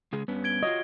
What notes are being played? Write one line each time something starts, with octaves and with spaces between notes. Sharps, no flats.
C#3 G#3 G#4
G2 B3 C#4
G#6 D7 G7
F4 F#4 C#5 D#5